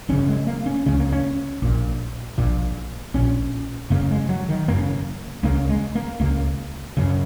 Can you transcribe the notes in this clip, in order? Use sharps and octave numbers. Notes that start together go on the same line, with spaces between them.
F#1 F#2 C#3 C#4
G#3
A#3
C#4
C#2 C#3 C#4
A#3
C#4
A#1 A#2
A#1 A#2
A#1 A#2 C#4
F#1 F#2 C#3 A#3
G#3
F#3
D#3
F#1 F#2 C#3 A#3
C#2 C#3 A#3
G#3
A#3
C#2 C#3 A#3
F#2 C#3